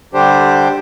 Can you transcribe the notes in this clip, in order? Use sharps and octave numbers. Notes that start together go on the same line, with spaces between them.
D3 G3 D4 G4 C5